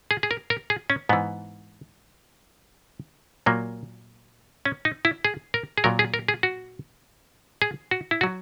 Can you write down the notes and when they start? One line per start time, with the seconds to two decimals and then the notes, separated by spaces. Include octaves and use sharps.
0.11 G#4
0.23 G#4
0.31 A#4
0.50 A#4
0.70 G#4
0.90 C#4
1.09 G#2 E3 B3
3.46 A#2 F#3 A#3
4.65 C#4
4.85 D#4
5.05 E4
5.25 G#4
5.54 A#4
5.78 G#4
5.84 A#2 F#3 A#4
5.99 G#4
6.14 A#4
6.28 G#4
6.43 F#4
7.62 G#4
7.91 F#4
8.11 E4
8.21 F#3 F#4